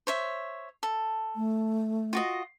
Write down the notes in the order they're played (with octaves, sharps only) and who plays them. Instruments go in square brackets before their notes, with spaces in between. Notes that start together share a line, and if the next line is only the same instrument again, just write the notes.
[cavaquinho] C5 C#5 E5
A4
[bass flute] A3
[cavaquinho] F4 F#4 D#5